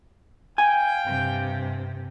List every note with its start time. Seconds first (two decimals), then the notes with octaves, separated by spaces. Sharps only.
0.58 F5 G5 G#5
1.04 G2 C3